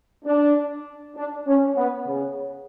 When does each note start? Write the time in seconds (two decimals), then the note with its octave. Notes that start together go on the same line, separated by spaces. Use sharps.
0.25 D4
1.16 D4
1.47 C#4
1.76 B3
2.07 C#3